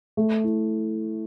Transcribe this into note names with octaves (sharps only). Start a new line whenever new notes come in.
A3
E4